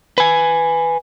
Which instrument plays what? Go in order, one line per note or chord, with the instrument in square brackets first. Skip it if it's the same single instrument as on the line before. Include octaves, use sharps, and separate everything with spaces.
[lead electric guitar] B4 G#5